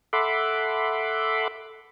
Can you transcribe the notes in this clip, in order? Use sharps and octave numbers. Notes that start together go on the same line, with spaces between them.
A4 E5 F#5 B5 C6 D6